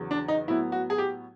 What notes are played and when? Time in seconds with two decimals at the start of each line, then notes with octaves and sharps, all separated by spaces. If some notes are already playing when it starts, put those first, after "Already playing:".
Already playing: E2 C#3 F#3
0.11 D4
0.28 D#4
0.47 A2 F#3 B3 E4
0.72 F#4
0.90 G#4
0.98 G4